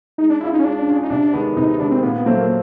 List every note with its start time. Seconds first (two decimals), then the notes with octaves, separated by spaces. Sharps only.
0.18 G#3 D#4
0.30 D4
0.41 C#4 E4 F4 G#4
0.53 D#4
0.59 C#4
0.64 G#3 D4
0.87 C#4 F4 G#4
1.03 D#4
1.10 C3 D4
1.33 D#3 G#3 B3
1.57 C3 D#4
1.68 D#4
1.79 D#3 G#3 B3 D4
1.91 C4
2.03 A#2 B3
2.14 B3
2.26 F#3 A3 A#3 C4
2.38 A#3